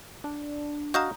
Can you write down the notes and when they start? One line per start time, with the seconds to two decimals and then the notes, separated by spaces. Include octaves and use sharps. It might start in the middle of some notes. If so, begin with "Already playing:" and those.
0.24 D4
0.94 F#4 D#5 F5 A#5 D#6 G6